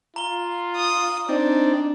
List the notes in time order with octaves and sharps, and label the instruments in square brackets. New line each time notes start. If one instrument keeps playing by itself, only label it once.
[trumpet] F4 [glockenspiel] A#5 G7
[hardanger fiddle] D#6
[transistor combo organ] C4 D#4 D5 [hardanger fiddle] D4